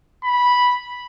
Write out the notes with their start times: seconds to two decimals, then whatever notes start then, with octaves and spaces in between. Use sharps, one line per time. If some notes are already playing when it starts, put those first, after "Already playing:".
0.24 B5